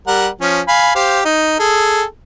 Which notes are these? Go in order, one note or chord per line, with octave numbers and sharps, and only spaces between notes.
G3 A#4 F#5
F3 C#4
F5 G#5 B5
G4 C5 F5
D#4
G#4 A4